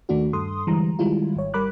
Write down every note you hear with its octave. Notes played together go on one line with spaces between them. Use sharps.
D#2 D#3 A3 D4 F#4
G2 A4 C6 D#6
D3 E3 G3 G#3 A#5
D#3 G3 G#3 E4 F4
G#1 C#5
G#1 G3 A#4 B5 D6 F#6